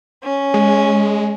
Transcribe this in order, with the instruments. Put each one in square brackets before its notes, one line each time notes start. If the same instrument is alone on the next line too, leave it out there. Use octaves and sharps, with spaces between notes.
[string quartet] C#4
[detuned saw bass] G#3